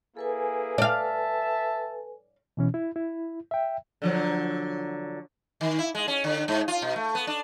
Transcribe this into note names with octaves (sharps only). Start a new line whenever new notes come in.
A#3 E4 G#4 A4 B4 G#5
D5 E5 F5 A5
B2 E3 C#4
E4
E4
E5 G5
D3 F3 F#3
D#3
E4
G#3
C#4
D3
G#2
F4
B2
A3
B3
D4